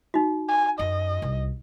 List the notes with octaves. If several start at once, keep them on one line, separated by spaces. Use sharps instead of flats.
D#4 F#4
G#5
F#2 D#5
C2